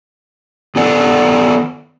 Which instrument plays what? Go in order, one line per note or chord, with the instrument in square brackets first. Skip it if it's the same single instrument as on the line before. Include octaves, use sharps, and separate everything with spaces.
[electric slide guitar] D#3 B3 A4 D5 F#5